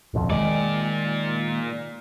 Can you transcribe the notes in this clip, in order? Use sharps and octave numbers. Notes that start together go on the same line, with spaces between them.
D1 B1 F2
A#2 D#3 G#3 D5